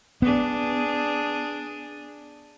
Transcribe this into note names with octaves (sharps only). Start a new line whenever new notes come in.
B3 D4 G#4